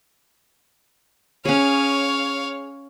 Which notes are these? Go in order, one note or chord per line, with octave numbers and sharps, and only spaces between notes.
C#4 G#4 C#5 F5